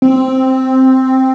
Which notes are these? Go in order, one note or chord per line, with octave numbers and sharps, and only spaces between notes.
C4